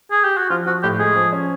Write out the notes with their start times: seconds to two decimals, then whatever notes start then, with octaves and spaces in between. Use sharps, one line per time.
0.11 G#4
0.24 G4
0.38 F#4
0.50 F3 F4
0.67 F3 F#4
0.83 A2 G4
0.99 G#3 G#4
1.16 F3
1.33 C#4